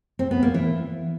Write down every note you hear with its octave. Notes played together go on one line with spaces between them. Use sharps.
C4
B3
A#3
E3